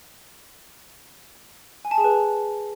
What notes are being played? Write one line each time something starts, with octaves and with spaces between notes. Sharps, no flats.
G#5
A5
G#4
B4